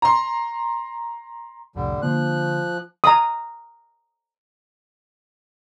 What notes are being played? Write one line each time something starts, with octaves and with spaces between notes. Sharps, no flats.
A#5 C6
C2 F2 A2 D3 G3
D3 F3 A#3 C6 F#6
A#5 D#6